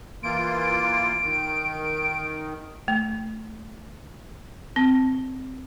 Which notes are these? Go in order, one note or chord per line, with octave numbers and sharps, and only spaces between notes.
E3 A#3 F4 D7
D#3
A3
C4